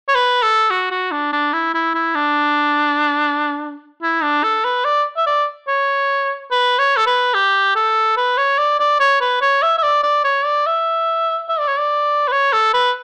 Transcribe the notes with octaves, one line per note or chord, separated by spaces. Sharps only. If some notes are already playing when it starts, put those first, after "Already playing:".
C#5
B4
A4
F#4
F#4
D4
D4
E4
E4
E4
D4
E4
D4
A4
B4
D5
E5
D5
C#5
B4
C#5
A4
B4
G4
A4
B4
C#5
D5
D5
C#5
B4
C#5
E5
E5
D5
D5
C#5
D5
E5
E5
D5
C#5
D5
B4
C#5
A4
B4